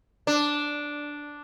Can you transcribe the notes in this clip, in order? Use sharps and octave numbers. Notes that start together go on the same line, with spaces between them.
D4